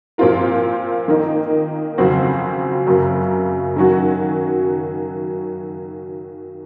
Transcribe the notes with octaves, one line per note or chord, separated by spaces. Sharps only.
A#2 F3 C4 F4 A#4
D#3 A#3 D#4
F2 C#3 F#3 C4 F#4
F#2 C#3 F#3 A#3
D#3 F#3 C#4 F#4